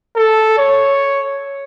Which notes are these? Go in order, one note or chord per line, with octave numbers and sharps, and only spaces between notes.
A4
C#5